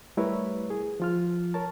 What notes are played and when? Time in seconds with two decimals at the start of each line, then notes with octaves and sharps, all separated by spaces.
0.17 G3 A3 E4 A#4 B4 C#5
0.70 G#4
1.00 F3 F4 F6
1.54 A#4 C#5 A5